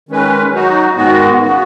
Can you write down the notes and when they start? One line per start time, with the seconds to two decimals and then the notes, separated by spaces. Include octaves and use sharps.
0.09 D#3 G#3 C#4 B4
0.53 F#3 D#4 F#4
0.94 G#2 D#3 G#3 B3 F#4
1.38 C#3 B3 F#4